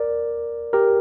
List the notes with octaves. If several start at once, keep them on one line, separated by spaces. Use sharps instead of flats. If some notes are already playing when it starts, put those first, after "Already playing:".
Already playing: A#4 D5
G4 A#4